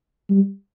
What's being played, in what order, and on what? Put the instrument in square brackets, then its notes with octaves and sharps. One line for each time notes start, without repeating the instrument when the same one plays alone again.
[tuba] G3